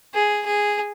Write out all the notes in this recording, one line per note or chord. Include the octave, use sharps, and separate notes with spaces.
G#4
G#4